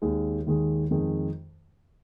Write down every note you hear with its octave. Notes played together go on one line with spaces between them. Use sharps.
D#2 D#3 G#3
D#2 D#3 G#3
F2 D#3 G#3